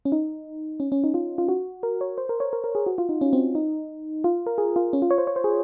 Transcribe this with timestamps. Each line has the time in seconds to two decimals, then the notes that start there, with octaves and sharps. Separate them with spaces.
0.05 C#4
0.12 D#4
0.80 C#4
0.92 C#4
1.04 D#4
1.14 F4
1.38 F4
1.49 F#4
1.83 A#4
2.01 C#5
2.18 C5
2.29 A#4
2.40 C#5
2.53 A#4
2.64 A#4
2.75 G#4
2.86 F#4
2.98 F4
3.09 D#4
3.21 C#4
3.33 C4
3.55 D#4
4.24 F4
4.46 A#4
4.58 G#4
4.76 F4
4.93 C#4
5.02 F4
5.11 C#5
5.18 C5
5.27 C#5
5.36 C5
5.44 G#4